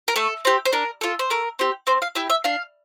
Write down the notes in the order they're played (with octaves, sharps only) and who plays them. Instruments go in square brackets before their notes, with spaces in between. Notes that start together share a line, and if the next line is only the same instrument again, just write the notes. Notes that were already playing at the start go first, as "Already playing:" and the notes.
[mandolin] A#4
A3 A4
C4 G4
C5
D4 A#4
F4 A4
C5
A3 A#4
C4 G4
C4 C5
F5
E4 G4 E5
E5
D4 F5